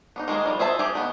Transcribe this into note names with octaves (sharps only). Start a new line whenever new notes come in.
B3 D4 D#4
D#3 G#3 A#3 A#4
F3 G3
G#4 C5 E5 A5
G4 G#4
D#3 B3